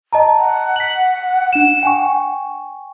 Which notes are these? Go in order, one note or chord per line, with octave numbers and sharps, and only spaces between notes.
D#5 A5 A#5
F#5
B6 F#7
D4 E7
G5 G#5 C#6